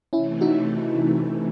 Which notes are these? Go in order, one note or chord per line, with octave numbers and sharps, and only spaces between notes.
C3 E3 A3 C#4 E4
D#4 F#4